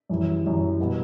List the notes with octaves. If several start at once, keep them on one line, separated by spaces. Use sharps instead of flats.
F#2 E3 G3
F#2 E3 G3
B2 G3 B3